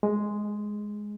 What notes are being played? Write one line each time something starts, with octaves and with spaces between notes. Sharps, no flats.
G#3